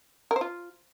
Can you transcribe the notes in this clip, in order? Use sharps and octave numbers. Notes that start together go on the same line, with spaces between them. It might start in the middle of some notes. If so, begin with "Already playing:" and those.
A#4
C5
F4